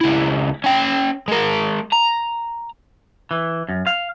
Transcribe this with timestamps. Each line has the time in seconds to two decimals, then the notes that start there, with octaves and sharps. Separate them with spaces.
0.01 C#2 E4
0.64 C#4 G5
1.28 G#3 A#4
1.92 A#5
3.31 E3
3.69 F#2
3.87 F5